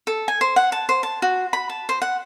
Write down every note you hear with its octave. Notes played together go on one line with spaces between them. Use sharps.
A4
G#5
C5
F#5
A5
C5
A5
F#4
B5
A5
C5
F#5